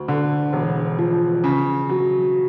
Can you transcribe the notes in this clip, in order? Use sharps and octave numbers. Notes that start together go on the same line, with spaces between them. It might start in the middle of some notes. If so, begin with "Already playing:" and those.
Already playing: D2
D3
E1
F3
C#3
F#3